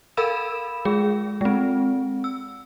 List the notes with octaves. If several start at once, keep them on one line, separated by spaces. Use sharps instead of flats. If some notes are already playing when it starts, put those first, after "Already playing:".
A4 A#4 F5 B5 E6 E7
G#3 G#4
G#3 C4
E6